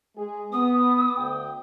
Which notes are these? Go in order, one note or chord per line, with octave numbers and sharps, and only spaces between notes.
G#3 G#4
B3 D#6
D2 G5